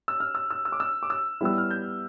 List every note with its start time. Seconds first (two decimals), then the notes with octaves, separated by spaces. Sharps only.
0.08 E6
0.20 F6
0.35 E6
0.50 E6
0.65 E6
0.72 D6
0.80 E6
1.03 D6
1.10 E6
1.41 G3 B3 E4 G4 E6
1.58 F6
1.70 G6